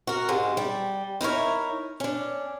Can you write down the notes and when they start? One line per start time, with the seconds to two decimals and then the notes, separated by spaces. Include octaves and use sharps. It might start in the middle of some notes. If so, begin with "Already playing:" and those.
0.07 F#4 A#4
0.29 G#2 C3 G#3
0.57 G3
1.21 D#4 E4 A#4 C#5
2.00 C#4 D4